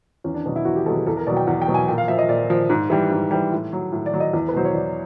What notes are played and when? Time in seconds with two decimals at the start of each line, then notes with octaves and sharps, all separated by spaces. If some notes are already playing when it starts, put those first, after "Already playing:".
0.24 E2 C#4
0.34 D4
0.46 B2 F#3
0.56 E4
0.65 E2 F#4
0.76 G4
0.86 B2 F#3 A4
0.96 G#4
1.06 E2 A4
1.17 A#4
1.27 B2 F#3 D5
1.37 G5
1.47 E2 F#5
1.62 G5
1.68 B2 F#3
1.74 G#5
1.88 A#2 G5
1.98 F5
2.08 F3 E5
2.19 D#5
2.29 A#2 D5
2.50 F3
2.70 G#2
2.90 E3 G3
3.11 G#2
3.31 E3 G3
3.52 A2
3.73 F#3
3.92 A2
4.06 D5
4.14 F#3
4.20 D#5
4.33 E2
4.49 B4
4.54 B2 F#3 C5
4.65 C#5
4.74 E2 D5